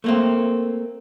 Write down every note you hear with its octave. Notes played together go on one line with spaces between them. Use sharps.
A3 A#3 C4